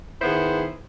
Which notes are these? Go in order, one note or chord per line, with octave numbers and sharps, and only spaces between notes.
D#3 B3 E4 G#4 C5